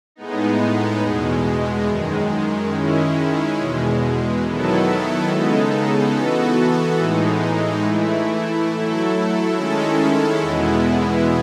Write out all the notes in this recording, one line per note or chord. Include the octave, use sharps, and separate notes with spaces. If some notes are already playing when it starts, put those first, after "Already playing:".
A2 G#3 B3 D#4
E2 B2 G#3
F#2 D#3 G#3
D#3 G#3 C#4 E4
E2 B2 G#3
D#3 F#3 B3 E4 A4
C#3 G#3 B3 D#4 A4
E3 B3 F#4 A4
A2 E3 G#3 D#4
E3 A3 E4
F#3 A3 E4 A4
D#3 G#3 C#4 E4 A4
E2 B2 G#3 B3 E4